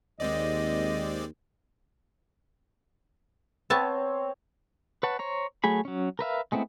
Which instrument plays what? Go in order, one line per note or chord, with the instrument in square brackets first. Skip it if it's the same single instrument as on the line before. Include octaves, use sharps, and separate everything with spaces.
[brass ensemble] D#2 [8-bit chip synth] G#3 C4 D5 [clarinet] D#5
[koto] B3 E5 A5 [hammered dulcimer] C4 C#5
[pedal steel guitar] B4 C#5 F#5 A5
C5 C#5 A#5
F#3 A3 G#4 B5
F#3 C#4
A#4 B4 E5 F5
G#3 A3 B3 C4 E4